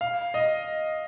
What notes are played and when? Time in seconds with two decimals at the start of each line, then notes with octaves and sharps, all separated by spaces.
0.01 F5
0.34 D#5